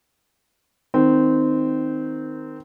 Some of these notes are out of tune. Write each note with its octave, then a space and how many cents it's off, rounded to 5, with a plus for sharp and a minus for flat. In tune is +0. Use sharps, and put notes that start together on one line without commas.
D#3 +0 C4 -15